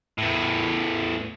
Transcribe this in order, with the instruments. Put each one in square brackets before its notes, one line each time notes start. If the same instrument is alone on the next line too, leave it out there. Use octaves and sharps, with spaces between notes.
[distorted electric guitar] E2 A2